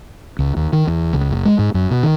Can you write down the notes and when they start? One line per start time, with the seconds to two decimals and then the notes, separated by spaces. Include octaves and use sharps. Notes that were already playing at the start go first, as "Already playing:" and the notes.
0.39 C#2
0.56 D#2
0.73 D#3
0.87 E2
1.13 C#2
1.31 F#1
1.45 G#3
1.59 G#2
1.74 F#2
1.91 B2
2.03 D#3